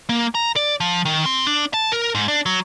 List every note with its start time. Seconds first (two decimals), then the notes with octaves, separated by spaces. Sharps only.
0.09 A#3
0.35 A#5
0.56 D5
0.80 F3
1.05 D#3
1.26 C4
1.46 D4
1.74 A5
1.92 A#4
2.15 G#2
2.28 D4
2.46 F#3